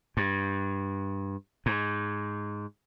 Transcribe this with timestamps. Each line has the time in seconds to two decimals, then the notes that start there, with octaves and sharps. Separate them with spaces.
0.17 G2
1.66 G#2